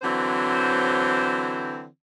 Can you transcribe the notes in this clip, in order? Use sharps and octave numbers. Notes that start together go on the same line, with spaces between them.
D3 E3 F#3 C4 C5